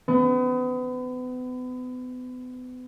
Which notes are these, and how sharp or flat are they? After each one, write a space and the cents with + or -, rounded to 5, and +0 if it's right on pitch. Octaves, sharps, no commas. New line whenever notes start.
B3 +35